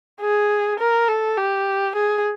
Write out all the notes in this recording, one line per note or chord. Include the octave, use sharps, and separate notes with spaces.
G#4
A#4
A4
G4
G#4